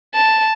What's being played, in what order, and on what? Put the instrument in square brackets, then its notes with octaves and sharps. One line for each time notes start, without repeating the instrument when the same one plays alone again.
[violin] A5